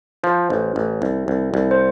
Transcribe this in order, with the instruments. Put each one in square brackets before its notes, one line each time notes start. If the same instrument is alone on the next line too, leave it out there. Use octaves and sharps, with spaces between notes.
[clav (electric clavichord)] F3 [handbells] C5
[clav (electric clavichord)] A1
A1
C2
C2
C2
[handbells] C5